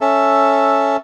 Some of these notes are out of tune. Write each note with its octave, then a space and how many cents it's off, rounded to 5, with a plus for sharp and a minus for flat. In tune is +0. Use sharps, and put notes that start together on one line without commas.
C#4 +0 A4 +0 E5 +0